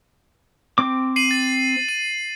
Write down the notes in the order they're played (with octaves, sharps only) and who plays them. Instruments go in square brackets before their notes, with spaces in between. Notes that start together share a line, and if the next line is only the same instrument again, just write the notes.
[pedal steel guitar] C4 D6
[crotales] C7 D#7 F#7
A6
D#7